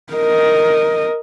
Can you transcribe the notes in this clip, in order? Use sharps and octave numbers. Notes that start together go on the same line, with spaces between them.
A#4 D#5